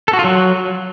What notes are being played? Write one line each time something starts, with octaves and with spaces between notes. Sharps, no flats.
A4
F#4
F4
F#3